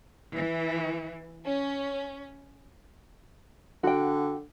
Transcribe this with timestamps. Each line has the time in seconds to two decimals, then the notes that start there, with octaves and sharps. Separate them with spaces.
0.34 E3
1.45 C#4
3.83 D3 F#4 G5